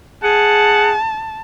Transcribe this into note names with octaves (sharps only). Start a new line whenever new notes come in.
G#4 F#5 A5